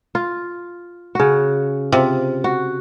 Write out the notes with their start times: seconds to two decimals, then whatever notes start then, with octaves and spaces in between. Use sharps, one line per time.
0.15 F4
1.15 C#3 F#4
1.92 C3 F4
2.44 F#4